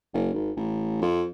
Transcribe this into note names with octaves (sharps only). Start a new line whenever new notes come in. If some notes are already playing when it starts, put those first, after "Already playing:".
F#1
G#1
A1
F2